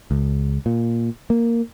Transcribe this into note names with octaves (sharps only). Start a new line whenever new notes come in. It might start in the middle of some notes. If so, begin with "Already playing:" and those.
C#2
A#2
A#3